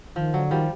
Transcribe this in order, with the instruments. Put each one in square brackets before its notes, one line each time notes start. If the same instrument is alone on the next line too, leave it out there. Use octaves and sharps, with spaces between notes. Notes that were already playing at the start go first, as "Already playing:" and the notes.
[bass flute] D#3 [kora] F3
[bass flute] D3 [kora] F#3
[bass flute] D#3 [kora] F3 G3